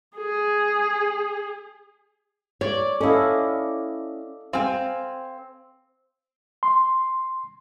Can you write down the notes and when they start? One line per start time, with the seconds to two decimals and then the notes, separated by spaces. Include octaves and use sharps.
0.16 G#4
2.61 C#5 D5
3.01 C#4 E4 A4 D#5 F5
4.53 C4 F5 G#5
6.63 C6